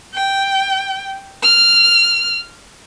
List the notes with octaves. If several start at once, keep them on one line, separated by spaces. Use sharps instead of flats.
G5
F6